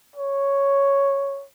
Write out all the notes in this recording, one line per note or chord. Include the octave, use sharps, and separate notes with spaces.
C#5